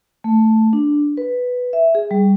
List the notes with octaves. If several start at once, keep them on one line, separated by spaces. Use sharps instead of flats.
A3
D4
B4
E5
G#4
G3